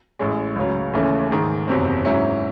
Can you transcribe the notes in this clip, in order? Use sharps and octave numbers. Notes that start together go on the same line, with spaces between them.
A1 A2 G#3 C#4
C#2 C#3 F#3
D#2 C#3 E3 A3 C#4
G#2 D#3 G#3
F#1 E2 C3 F#3 C4
G#2 F#3 C#4 E4